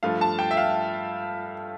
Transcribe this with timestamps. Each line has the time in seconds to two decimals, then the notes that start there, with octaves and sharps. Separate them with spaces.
0.03 G2 F3 A3 F5
0.21 A5
0.39 G5
0.51 E5
0.57 F5